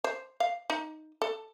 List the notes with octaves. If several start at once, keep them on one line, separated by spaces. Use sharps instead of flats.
C5
F5
D#4
A4